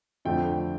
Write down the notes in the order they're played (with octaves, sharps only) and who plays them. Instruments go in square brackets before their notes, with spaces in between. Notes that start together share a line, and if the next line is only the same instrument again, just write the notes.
[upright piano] F2 D3 F3 A3 G5